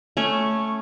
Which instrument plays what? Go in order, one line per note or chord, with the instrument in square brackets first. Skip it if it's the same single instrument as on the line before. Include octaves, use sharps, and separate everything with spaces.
[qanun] A3 C#4 C#5